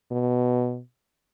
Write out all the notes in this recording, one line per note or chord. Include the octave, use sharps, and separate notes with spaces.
B2